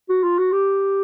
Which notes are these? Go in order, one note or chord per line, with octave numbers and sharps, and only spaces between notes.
F#4
F4
F#4
G4